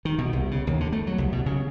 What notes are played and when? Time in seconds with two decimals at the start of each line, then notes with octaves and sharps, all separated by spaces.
0.05 D#3
0.18 B2
0.33 C2
0.51 C#3
0.67 D#2
0.80 D3
0.92 A3
1.07 F#3
1.18 C2
1.32 B2
1.46 C#3